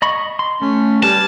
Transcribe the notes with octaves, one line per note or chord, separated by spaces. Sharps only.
D#5 B5 C#6
C6
A3 C#4
G3 B4 G#5 A5 F6